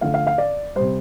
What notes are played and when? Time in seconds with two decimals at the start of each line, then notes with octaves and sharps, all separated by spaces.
0.01 D3 F3 A3 F5
0.14 F5
0.27 F5
0.38 D5
0.76 C3 G3 C5